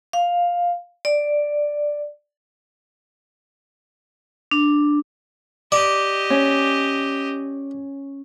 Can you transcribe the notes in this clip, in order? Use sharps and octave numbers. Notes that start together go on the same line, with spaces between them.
F5
D5
D4
G4 D5 D#5
C#4